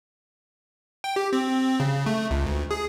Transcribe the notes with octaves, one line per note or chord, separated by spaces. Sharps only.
G5
G4
C4
C#3
A3
C#2
D2
G#4